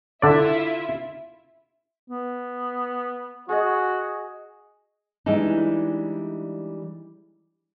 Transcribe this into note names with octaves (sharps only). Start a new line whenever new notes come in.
D3 E4 F4 D5 E5
B3
F#4 G#4 D#5
E3 G3 G#3 D4 D#4